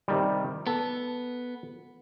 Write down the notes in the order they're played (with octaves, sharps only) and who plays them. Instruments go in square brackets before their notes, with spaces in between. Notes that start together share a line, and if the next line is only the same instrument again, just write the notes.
[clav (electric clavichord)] C3 D#3 G3
[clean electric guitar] B3 [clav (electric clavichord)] A4